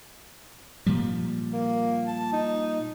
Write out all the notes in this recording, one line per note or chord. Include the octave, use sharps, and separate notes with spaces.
A#2 F3 G3
A#3
A5
D#4